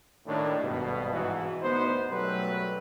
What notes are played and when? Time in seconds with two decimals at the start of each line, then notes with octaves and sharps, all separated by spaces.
0.26 D#2 A2 D4
0.62 G#1 G2 B2
1.13 G#2 E3 F#4
1.62 D2 B3 D#4 C5
2.09 F#2 B2 F#3 G3 A3 B4